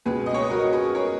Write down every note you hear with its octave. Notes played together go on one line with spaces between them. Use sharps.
C#2 B2 G#4 B4
D#5
C#5
B4
F#4 A#4
G#4 B4
A#4 C#5